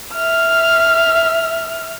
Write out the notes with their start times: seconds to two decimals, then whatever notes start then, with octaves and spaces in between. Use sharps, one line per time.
0.14 E5 F6